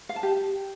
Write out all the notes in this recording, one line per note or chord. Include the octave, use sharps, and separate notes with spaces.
F5
A5
G4